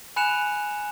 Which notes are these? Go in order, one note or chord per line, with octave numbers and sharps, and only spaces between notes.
G#5 B5 F#6 C#7 E7 F7